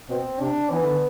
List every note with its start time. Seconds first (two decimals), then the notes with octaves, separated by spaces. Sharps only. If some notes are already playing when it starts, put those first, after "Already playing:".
0.09 B2 C4
0.40 C3 D4
0.71 E3 B3
0.84 D3